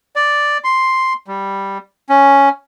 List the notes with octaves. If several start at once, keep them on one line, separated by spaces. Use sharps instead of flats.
D5
C6
G3
C#4